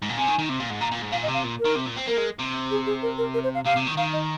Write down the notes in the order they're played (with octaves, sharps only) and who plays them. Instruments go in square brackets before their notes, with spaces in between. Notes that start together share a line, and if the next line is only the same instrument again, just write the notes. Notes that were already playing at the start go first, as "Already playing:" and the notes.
[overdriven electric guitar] G#2
A#2
[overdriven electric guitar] C3 [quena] G#5
[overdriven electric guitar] D#3
D#3
C3
A#2
G#2
[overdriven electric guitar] A#2 [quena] A#5
[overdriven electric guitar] A#2
G#2
[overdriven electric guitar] A#2 [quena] F5
[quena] D#5
[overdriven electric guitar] C3
[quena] F5
[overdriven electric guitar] A#2
[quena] A#4
[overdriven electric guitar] D#3
C3
A#2
C4
[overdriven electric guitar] A#3 [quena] A#4
[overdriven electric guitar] G#3
C3
[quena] G#4
G#4
A#4
A#4
A#4
C5
F5
[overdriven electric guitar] C3 [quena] F5
[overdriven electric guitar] C3
D#3
[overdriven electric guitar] D#3 [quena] F5
[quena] D#5